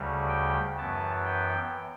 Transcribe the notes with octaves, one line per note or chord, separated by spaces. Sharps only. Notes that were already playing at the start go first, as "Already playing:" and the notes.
Already playing: D2 C#3 G3
G5
F#2 E3 B3 A5
G5